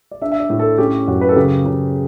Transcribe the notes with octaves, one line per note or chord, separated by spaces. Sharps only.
D5
D4 E5
E5
D5
A2
A4
C#4 G4
F#2 F#4
B4
A4
C#3 G4
C#3